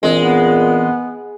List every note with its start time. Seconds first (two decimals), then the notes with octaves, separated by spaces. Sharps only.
0.03 A#2 E3 G#3 C4 D4
0.21 B3